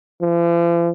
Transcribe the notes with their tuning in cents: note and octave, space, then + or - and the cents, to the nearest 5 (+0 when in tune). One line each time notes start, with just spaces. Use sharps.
F3 -45